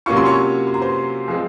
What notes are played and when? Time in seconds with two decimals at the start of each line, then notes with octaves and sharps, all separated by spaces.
0.06 C3 F#3 A#3 C#4 F4 C#6
0.17 C6
0.26 C#5 C#6
0.67 C6
0.74 A#5
0.82 C5 C6
1.28 F3 G#3 C4